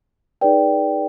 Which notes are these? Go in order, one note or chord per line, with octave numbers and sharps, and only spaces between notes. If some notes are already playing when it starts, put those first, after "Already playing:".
D#4 G#4 B4 D5 G5